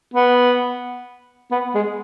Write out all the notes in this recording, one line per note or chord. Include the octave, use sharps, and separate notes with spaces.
B3
B3
G#3